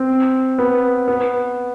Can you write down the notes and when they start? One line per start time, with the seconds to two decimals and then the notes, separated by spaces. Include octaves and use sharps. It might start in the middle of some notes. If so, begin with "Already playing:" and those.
Already playing: C4
0.58 B3
1.08 B3